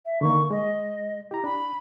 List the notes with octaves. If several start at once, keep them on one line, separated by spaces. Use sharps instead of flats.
E5
D3 D#3 A#3 C#6
G#3 D#5
E4 G4 A#5
D4 B5